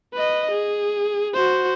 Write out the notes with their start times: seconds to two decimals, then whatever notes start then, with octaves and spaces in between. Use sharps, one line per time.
0.14 B4 D#5
0.51 G#4
1.34 F#4 C5